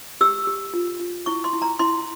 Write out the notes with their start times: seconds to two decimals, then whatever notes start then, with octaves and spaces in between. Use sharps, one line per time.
0.21 G4 E6
0.47 G4
0.74 F4
1.00 F4
1.26 E4 C#6
1.44 C6
1.53 E4
1.62 A#5
1.79 E4 C6